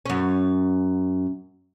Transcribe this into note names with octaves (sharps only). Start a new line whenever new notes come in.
F#2 C#4